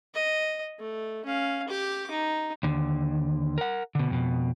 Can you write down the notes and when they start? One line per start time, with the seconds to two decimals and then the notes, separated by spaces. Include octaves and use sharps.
0.14 D#5
0.79 A3
1.25 C#4 F5
1.68 G4 D6
2.11 D#4
2.63 D#2 D3
3.58 A#4 F#5
3.95 B2 D3
4.10 F2 B2